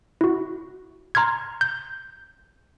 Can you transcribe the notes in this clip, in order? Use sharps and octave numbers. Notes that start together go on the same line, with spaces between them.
E4 F#4
A#5 C6 F6 G#6
G6